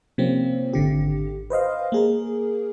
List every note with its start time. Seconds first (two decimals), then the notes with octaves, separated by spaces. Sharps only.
0.18 C3 F3 A#3 C4 C#4
0.73 G#1 D3 G4
1.50 B4 C5 D#5 F5
1.92 A#3 G#4 A#4